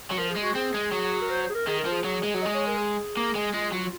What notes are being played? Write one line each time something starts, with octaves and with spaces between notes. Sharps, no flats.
F#3
F3 A#4
G#4
G#3
F#4
C4 G#4
G#3
F#3
A#4
C5
C5
G#4
A#4
D#3 G#4
A#4
F3
G#4
F#3
G#3
F#3
G#3 D#5
C#5
A#4
G#4
A#3
G#3
G#3 F4
F#3